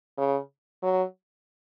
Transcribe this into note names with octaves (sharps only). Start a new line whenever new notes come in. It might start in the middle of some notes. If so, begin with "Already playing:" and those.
C#3
F#3